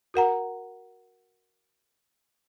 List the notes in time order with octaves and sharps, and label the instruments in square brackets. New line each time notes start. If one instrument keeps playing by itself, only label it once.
[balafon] F#4 A#4 F#5 A#5